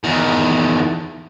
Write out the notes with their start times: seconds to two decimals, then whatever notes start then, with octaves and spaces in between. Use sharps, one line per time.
0.04 E2 D#3